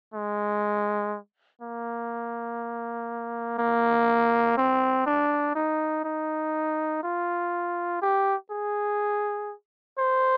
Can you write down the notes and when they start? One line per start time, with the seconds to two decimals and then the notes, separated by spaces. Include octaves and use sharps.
0.14 G#3
1.61 A#3
3.58 A#3
4.57 C4
5.06 D4
5.55 D#4
6.04 D#4
7.03 F4
8.02 G4
8.51 G#4
9.99 C5